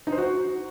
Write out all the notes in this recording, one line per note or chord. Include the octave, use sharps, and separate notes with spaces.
D#4
C5
F#4